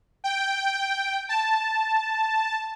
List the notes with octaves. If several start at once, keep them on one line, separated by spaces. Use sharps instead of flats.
G5
A5